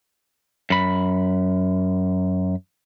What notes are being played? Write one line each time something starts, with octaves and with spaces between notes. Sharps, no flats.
F#2 B5